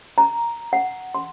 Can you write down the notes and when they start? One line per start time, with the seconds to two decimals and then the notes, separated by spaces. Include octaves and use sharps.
0.18 A#5
0.73 F#5
1.15 C6